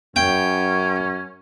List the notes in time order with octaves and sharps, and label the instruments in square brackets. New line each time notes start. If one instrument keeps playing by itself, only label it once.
[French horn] F#2 [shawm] C#4 [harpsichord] G5